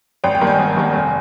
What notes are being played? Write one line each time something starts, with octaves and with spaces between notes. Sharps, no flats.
G#1 G5
G5
G2 D#3 A#3
G#5
G#1
G2 D#3 A#3
F1